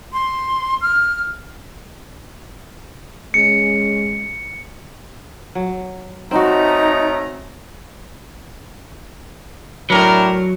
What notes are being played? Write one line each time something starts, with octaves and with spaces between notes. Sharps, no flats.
C6
F6
G#3 C#4 C#7
F#3
A3 C4 C#4 D#4 F#4 A#5
A2 F#3 D4 A#4